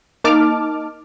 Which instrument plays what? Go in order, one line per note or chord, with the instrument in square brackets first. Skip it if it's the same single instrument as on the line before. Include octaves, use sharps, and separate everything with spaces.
[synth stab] A#3 D#4 A5 D6 F6